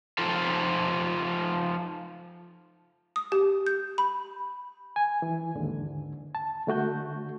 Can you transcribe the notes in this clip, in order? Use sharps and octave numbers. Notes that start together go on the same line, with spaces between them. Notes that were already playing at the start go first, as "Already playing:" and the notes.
F3 D#4 F4 A4 C5
D#6
G4
G6
B5
G#5
E3
D#2 G#2 D3
A5
D3 A3 F#4 G6